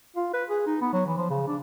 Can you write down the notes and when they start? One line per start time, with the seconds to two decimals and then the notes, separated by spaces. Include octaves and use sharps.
0.16 F4
0.34 B4
0.49 G#4
0.66 D#4
0.81 B3
0.93 F#3
1.06 E3
1.17 F3
1.30 C#3
1.47 D4